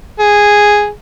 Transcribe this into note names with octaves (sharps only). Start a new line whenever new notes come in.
G#4